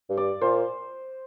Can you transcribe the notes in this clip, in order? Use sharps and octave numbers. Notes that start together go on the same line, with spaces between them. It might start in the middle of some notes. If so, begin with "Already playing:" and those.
G2
D5
A#2 C5